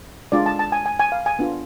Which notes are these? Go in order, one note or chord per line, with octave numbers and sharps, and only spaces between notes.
G#3 D4 F4 D5
A5
A5
G#5
G#5
G#5
F5
G#5
B3 D4 F4